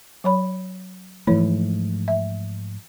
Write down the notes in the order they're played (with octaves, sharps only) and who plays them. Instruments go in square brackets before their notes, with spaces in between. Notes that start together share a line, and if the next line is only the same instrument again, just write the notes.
[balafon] F#3 C#5 B5
[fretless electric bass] G#2 F3 A3 [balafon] E3 E4 C#5
[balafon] E5